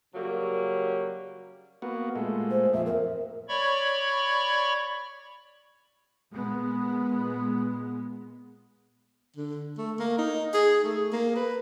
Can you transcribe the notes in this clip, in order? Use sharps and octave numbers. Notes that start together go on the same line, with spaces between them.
C#3 F#3 G3 A#3
A#3 B3 F#4
A#2 G#3 A3
C5
F2 A#2 E5
A#4
C#5 D5 B5 C#6
A#2 G#3 B3
D3
A3
A#3
D#4
G#4
A3
A#3
B4